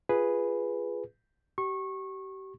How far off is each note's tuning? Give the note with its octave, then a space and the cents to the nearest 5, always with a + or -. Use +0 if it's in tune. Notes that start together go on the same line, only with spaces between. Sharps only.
F4 +0 G#4 +0 B4 +0
G4 -35 C#6 -25